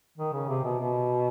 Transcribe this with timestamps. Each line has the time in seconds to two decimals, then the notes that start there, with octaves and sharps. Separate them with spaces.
0.18 D#3
0.33 C#3
0.49 C3
0.64 B2
0.79 B2